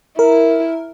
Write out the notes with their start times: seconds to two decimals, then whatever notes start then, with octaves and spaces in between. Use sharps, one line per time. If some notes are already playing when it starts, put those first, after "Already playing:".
0.19 E4 A#4